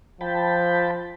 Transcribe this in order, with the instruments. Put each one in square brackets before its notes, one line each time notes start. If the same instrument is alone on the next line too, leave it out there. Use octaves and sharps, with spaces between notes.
[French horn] F3 [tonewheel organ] G5 A5 B5